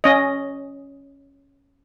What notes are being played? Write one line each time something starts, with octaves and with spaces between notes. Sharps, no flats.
C#4 D#5